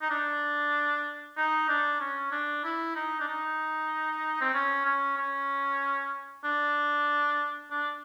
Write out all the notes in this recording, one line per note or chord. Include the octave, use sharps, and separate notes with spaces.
D#4
D4
D#4
D4
C#4
D4
E4
D#4
D4
D#4
C4
C#4
C#4
C#4
D4
D4